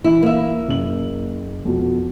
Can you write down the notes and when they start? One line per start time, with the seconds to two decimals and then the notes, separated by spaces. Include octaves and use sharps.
0.04 E3 E4
0.22 A#3 E5
0.68 F#1 F#7
1.65 F2 B2